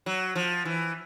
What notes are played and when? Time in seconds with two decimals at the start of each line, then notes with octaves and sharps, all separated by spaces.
0.06 F#3
0.36 F3
0.65 E3